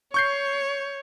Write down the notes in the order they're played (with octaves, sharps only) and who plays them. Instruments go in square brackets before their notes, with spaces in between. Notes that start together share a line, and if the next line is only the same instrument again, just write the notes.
[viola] C#5 [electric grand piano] C#6 G6 C7